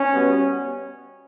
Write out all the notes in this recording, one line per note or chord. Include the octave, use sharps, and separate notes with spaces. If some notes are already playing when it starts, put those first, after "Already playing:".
Already playing: C#4
B2 G3 B3